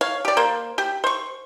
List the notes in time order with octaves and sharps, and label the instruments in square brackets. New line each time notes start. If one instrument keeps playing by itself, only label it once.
[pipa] C#5 F5
G4 D5
A#3 C5
G4
C5 C#6